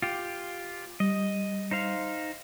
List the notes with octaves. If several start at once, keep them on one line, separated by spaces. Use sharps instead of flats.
F4 G4
G3 D#5
D#4 C5 F5